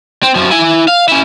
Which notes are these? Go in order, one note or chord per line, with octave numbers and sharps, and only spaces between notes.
C4
F#2 F3
E4 G#5
F5
C#4 E4